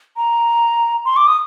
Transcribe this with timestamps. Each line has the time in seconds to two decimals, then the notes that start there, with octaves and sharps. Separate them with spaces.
0.17 A#5
1.05 C6
1.17 D6
1.27 D#6